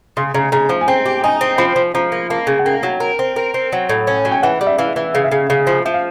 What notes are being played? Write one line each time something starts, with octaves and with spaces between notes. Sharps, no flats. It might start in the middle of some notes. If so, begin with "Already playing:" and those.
C#3 C6
C#3 A#5
C#3 A#5
F3
G#5
C4 G5
G4
D#4 G#5
C4
F3 B5
F3
F3 A#5
A#3
A#3 A5
C#3
F#5
A#3 G5
F#3
A#4
C4
A#4
C4
F#3
A2
C#4
F#3
G5
E3 F#5
G3
E5
E3 F5
E3
C#3 F5
E5
C#3 F5
C#3 F5
F3
F3 E5
F5